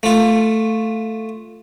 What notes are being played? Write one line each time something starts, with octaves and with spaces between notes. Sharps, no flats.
A3 F4